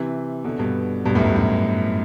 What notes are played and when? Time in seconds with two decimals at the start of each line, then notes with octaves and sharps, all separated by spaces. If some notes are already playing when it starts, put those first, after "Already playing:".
Already playing: C3 E3
0.44 B2 D3
0.59 G2 B2
1.05 G2 B2
1.15 F#2 A2
1.26 G2
1.36 F#2